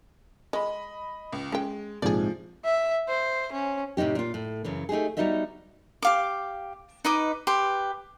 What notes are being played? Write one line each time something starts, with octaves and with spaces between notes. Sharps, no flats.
G#3 D#5 B5
C#2
G#3 C#4 G5
A#1 G#2 C3 F3 G#4 D5
E5
C5
C#4
A2 C3 C#4 D#4 G4
A#2 F4
A2
F#2 C#3 E3
A3 D#4 G4 G#4
G3 B3 D#4 F#4 D#5 E5
G4 F5 D6
D#4 B4 D#5 D6
G4 B4 C6